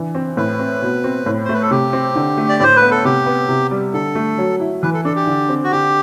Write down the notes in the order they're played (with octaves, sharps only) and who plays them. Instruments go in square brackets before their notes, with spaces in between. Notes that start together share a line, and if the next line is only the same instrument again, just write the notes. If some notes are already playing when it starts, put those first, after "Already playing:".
Already playing: [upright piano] E3 D4
C4
[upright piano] A2 [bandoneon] B4
[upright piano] C4
B2
C4
A2
[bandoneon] C5
[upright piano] A3 [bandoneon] B4
[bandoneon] A4
[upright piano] C3 [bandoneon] G4
[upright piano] C4
D3
A3
[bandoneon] D5
[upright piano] A2 [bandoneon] C5
[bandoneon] B4
[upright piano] B3
[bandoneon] A4
[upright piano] C3 [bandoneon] G4
[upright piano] B3
C3
G3
[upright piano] D3 [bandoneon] A4
[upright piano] A3
F#3
E4
[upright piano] E3 [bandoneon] B4
[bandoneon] A4
[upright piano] D4 [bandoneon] A4
[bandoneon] G4
[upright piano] D3
C4
[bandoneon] F#4
[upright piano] D3 [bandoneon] G4